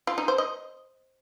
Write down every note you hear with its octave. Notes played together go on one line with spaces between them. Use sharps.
F4
D#4
C5
D#5